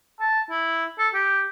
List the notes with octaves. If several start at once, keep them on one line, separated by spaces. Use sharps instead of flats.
A5
E4
A4
G4